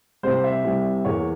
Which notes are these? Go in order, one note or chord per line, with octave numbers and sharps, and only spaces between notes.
C2 C3 G3 C5
E5
C2 C3 G3
E2 E3 A#3 C#5